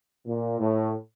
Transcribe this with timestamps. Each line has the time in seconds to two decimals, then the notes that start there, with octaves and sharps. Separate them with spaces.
0.26 A#2
0.59 A2